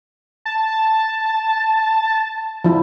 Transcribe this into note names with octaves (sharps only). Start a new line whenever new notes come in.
A5
F3 E4